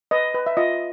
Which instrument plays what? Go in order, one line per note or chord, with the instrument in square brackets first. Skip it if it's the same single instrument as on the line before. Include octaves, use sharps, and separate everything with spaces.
[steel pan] B4 D#5
B4
E5
F4 D#5